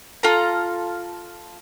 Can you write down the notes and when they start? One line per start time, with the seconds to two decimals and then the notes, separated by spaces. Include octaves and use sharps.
0.23 F4 A4 F5 A#5